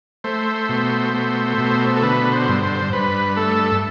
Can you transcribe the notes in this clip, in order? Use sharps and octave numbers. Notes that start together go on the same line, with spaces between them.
A3 C5
B2
A3
B2
A4
D3 B4
C5
G2
C5
G2 B4
A3 A4